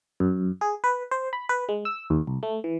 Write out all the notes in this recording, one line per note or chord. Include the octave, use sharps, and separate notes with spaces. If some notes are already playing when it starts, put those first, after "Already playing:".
F#2
G#4
B4
C5
B5
B4
G#3
E6
D#2
C2
A3
E3